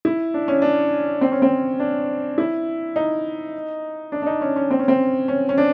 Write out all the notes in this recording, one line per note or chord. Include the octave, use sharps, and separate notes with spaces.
E4
D4
C#4
D4
C4
C#4
C4
D4
E4
D#4
D4
D4
D#4
C#4
C#4
C4
C#4
C4
C#4
C#4
D4